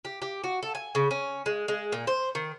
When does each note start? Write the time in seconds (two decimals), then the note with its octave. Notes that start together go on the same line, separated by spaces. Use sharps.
0.05 G4
0.22 G4
0.44 F#4
0.63 A4
0.75 G#5
0.95 C#3
1.11 C#4
1.46 G#3
1.68 G#3
1.92 A#2
2.07 C5
2.35 D#3